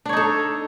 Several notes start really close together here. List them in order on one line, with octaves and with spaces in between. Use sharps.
D4 C#5 D#4 A4